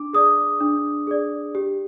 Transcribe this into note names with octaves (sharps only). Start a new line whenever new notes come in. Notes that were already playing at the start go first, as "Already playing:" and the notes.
Already playing: D4 D6
G#4 D5 D#6
D4
G#4 D5
G4